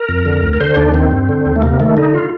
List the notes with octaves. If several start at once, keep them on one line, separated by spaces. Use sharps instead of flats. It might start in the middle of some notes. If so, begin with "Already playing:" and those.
Already playing: A#4
F2
D3
D2
A#4
D3 C5
D#2 D4
D#3 C4
G2
D3
D#2
A3
C3 A#3
D#3 A3
D3 D#4
F4